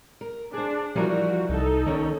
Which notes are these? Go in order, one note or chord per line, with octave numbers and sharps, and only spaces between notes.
A#4
D4 G#4 C5
E3 F3 G3 F#4 A#4
C2 D#4 A4
D#3 A#3 C#4